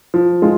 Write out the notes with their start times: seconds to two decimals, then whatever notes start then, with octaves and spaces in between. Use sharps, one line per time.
0.14 F3
0.42 G#3 F4